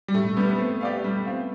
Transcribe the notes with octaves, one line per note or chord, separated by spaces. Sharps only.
G3
A2 A3
G3 B3 D4
B3
A3 C4
G4 D5 F5
G3
C4 F4